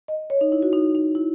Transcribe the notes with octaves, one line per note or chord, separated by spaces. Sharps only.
D#5
C#5
D#4
E4
F#4
D#4
D#4
E4